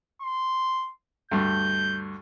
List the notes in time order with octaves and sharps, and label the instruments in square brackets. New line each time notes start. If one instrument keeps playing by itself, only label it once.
[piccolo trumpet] C6
[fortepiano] D2 G2 [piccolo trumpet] G6